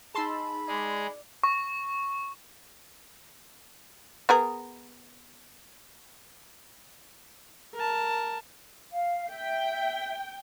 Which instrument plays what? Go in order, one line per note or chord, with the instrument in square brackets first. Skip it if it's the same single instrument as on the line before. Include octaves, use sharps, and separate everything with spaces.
[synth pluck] D#4 G#4 [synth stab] A5 C6 E6 [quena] B5
[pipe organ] G#3 G#4 [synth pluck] D5
[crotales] C#6
[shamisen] B3 G#4 A#4
[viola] A#4 A5
[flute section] F5
[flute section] E5 [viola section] G5